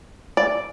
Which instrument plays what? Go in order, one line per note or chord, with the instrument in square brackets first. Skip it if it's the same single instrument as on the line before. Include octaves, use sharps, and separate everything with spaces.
[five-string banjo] D5